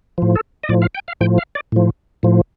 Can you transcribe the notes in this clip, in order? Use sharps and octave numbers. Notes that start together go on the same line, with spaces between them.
A2 F3
A4
D#5
A2 F3 D5
F5
G5
F5
A2 F3 G5
F5
D5
A2 F3
A2 F3